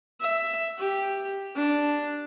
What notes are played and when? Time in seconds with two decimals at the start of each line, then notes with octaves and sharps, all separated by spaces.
0.21 E5
0.79 G4
1.56 D4